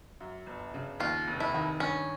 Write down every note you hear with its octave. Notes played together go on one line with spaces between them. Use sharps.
F#2
G1
C#3
D#2 F4
F1
E4
D#3
G2 C#4